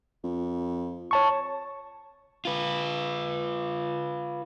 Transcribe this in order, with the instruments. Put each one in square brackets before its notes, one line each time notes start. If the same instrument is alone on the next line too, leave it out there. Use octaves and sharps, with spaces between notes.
[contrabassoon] F2
[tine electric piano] C#5 A5 C#6
[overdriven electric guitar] F4 B4